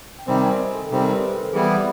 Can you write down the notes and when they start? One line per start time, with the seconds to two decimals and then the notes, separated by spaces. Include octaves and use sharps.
0.19 G5
0.27 C3 D#3 G3 C4 G#5
0.43 G#5
0.59 D#5
0.75 A4
0.90 C3 D#3 G3 C4 A#4
1.02 C5
1.12 B4
1.33 A4
1.53 E3 G3 B3 E4 G#4